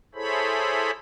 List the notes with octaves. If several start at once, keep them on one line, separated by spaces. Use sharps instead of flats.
E4 G#4 A4 C5 C#5 B5